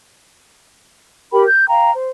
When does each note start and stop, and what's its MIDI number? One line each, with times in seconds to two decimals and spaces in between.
1.33 1.44 67
1.33 1.44 70
1.33 1.44 79
1.33 1.44 83
1.47 1.68 91
1.69 1.91 77
1.69 1.91 79
1.69 1.91 82
1.94 2.09 72